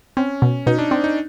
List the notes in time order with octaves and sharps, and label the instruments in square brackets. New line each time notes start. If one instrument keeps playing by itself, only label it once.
[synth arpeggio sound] C4 [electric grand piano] C#4
[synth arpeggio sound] B2
[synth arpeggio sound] B2 [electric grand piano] D#4
[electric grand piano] D4
[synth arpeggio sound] C4 [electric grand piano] D4
[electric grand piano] D#4